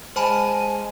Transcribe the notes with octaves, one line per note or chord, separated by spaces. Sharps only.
G#3 C5 G#5 A5 B5